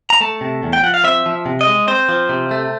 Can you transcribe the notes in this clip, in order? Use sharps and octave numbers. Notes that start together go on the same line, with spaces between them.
A#5
A3 A5
C3
E2
G5
F3 F#5
F5
C4 E5
F3
C3
D#5
G#3
C4 C5
F3
C3
A3